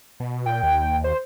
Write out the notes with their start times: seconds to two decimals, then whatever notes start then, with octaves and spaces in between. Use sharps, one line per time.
0.20 B2
0.46 A#2 G5
0.63 D#2
1.04 C5